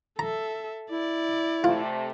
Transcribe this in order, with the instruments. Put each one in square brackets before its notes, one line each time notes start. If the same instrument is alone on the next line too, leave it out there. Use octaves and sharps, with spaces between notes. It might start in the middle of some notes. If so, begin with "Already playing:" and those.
[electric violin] A4 E5 [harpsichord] A#5
[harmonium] E4 [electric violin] D5
[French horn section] C3 A3 [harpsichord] F4